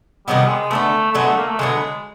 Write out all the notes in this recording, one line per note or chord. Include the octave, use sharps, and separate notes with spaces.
C3 D#3 F#3 G3 B3
G#3
D3 F#3 A3 B3
A3
D3 F#3 G#3 B3
A3
A#3
A3
D3 F#3 G#3 B3